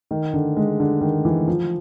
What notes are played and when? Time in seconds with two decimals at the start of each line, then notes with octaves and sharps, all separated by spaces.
0.11 D#3
0.33 D3
0.57 G#3
0.80 D3
1.01 D#3
1.25 E3
1.48 F3